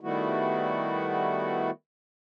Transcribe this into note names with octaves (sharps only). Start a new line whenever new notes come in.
D#3 G3 A3 B3 E4 F#4